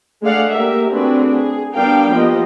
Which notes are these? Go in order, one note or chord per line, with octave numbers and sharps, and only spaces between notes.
G#3 A3 D4 D5 F5 F#5
A#3 G4 A#4 E5
A3 C4 D4 F#4 G#4 B4
G#4
G3 B3 D4 A#4 F5 G5
F3 A#3 B3 G4 D#5